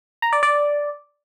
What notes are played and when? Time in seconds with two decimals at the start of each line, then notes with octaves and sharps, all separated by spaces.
0.22 A#5
0.33 D5
0.43 D5